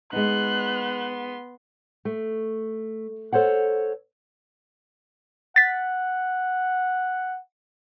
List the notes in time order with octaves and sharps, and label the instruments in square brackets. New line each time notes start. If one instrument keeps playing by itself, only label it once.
[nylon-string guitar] G#3 D#4 [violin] B3 C6 [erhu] F#6
[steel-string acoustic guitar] A3
A4 C5 C#5 F#5
[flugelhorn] F#5 [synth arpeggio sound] A6 B6